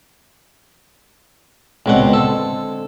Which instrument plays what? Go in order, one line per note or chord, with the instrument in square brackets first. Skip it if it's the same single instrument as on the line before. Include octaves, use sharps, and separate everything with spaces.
[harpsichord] C#2 B2 F#5 [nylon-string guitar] D3 G#3 C4
[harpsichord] A4